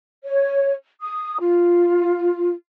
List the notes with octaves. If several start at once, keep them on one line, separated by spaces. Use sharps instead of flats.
C#5
D#6
F4